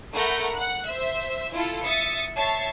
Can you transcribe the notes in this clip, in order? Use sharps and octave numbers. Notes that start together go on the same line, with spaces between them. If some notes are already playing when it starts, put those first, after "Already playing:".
A3 A#4 F#5 A#5 B5 G6
F#5 F#6
C5 E5
E4 F4 A4
E5 D#6 A6 C#7
C#5 E5 A5 C7